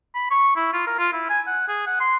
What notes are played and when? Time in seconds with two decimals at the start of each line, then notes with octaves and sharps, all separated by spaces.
0.15 B5
0.31 C#6
0.57 E4
0.73 F4
0.87 A#4
0.99 F4
1.13 E4
1.30 G#5
1.47 F#5
1.68 G#4
1.87 F#5
2.00 C6